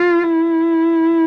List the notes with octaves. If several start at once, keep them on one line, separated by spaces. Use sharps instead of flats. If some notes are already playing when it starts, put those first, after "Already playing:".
Already playing: F4
E4